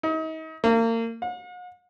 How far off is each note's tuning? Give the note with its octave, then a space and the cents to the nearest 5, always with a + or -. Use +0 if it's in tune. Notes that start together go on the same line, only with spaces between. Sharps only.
D#4 +35
A#3 -35
F#5 -45